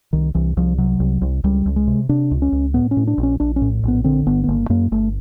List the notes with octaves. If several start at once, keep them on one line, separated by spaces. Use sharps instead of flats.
C2 D#3
C2 E3
C2 F3
C3 F#3
C2
C2
C#2 G3
C#2
G#3
C3
C3 D4
C#2
C#4
C#2
A2 B3
C#4
A2
D4
A#1
C#4
A#1 D4
C#4
A2
A#1 B3
D3 C4
G1 B3
B3
G1 A#3
F#2 A#3
G1 A3